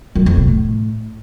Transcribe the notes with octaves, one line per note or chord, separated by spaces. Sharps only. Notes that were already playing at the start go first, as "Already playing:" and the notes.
F#2
F2
B2
A2